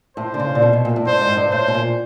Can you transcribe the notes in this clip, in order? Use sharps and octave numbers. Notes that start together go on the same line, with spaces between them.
A2 C5
D3
C#3
A#2
B2
B2
A#2
A2
G2 C5
G#2
G2
A2 C5
B2
A#2